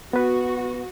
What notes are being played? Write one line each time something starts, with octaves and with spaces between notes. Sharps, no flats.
B3 F#4 B4